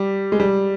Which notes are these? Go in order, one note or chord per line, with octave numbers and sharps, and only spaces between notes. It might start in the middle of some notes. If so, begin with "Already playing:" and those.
Already playing: G3
G#3
G3